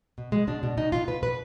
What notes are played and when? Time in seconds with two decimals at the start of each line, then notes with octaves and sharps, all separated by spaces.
0.18 B2
0.32 B2 G#3
0.47 B2 D4
0.63 B2
0.77 B2 D#4
0.92 B2 F4
1.08 B2 B4
1.23 B2 B4